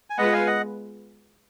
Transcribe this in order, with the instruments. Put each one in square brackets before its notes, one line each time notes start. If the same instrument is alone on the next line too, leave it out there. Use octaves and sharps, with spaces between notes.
[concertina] G#5
[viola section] G#3 B3 F4 B4 [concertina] D#5 F#5
[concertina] F5 G#5
D#5 F#5